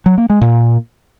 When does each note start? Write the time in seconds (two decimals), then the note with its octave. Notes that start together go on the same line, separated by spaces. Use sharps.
0.06 F#3
0.18 A#3
0.30 G#3
0.41 A#2